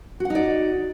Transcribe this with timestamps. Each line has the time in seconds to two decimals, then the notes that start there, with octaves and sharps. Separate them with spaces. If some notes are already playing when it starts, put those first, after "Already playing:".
0.20 F#4
0.25 F#5
0.30 D#4
0.35 D5